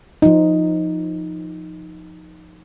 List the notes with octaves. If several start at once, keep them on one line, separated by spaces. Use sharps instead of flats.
F3 D#4